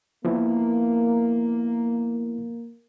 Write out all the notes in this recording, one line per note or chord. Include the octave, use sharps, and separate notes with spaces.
F3 A#3 B3 E4